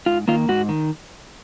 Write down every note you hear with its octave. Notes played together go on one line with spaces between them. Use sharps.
G#2 F4
D#3 A#3 F4
G#2 F#4
D#3